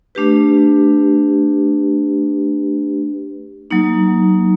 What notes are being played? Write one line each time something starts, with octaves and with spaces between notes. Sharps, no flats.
A3 D4 G4 B4
F#3 A#3 D#4